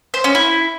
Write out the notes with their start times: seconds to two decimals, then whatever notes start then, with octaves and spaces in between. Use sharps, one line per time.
0.14 C5
0.24 C#4
0.35 E4